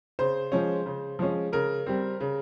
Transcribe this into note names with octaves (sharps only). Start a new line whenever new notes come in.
C#3 C5
F3 G#3 C#4
C#3
F3 G#3 C#4
C#3 A#4
G3 C4
C#3